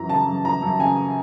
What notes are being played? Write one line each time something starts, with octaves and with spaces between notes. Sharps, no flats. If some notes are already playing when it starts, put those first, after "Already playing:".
Already playing: F#2 E3 A#5
C#3 A5
F#2
E3 A#5
F#2
C#3 G#5